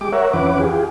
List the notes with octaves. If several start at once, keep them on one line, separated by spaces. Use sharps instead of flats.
G#3 G4 D6
A#4 C#5 E5 F#5
F2 E3 C#4 B4 F#5 D6
F4 G4 G#4